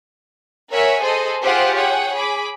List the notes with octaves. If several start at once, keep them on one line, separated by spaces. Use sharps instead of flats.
A#4 C#5 E5 F#5 G#5
G#4 A4 C5 D#5
F4 G4 G#4 C5 F5 F#5
G#4 C#5 F#5 G5
G#4 B5 D6